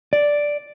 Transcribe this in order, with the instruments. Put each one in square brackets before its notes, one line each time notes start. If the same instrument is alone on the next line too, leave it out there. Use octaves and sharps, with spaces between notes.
[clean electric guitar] D5